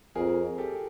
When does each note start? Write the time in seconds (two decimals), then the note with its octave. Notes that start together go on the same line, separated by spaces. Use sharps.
0.15 F2 G#4 A#4
0.58 G4 A4